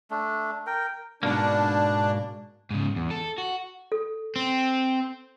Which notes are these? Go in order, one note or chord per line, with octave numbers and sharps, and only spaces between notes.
A3 D4
A#4 G5
G#2 B2 A#3 D4
G#2 C#3
E2
A4
F#4
A4
C4